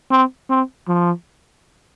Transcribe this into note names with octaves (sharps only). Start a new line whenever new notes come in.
C4
C4
F3